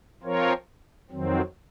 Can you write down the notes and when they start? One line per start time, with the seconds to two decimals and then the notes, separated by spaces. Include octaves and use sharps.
0.23 F3 C4 F4 A#4 C#5
1.10 F2 D#3 F#3 C4